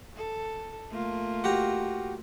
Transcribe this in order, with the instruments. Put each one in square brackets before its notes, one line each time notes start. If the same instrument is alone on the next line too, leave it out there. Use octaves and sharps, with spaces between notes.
[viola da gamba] A4
A3 A#3 F4
[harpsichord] F#4 G4 A#5